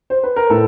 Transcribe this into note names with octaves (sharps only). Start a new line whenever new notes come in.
C5
B4
A#4
A2 A4